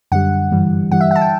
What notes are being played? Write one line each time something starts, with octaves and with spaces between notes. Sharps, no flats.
F#2 D3 G3 F#5
G2 E3 G3
G2 E3 G3 F#5
E5
F#5
A5
G5